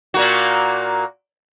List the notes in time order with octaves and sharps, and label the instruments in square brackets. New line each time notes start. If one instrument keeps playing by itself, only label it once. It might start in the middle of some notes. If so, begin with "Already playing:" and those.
[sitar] A#2 A#3 F#4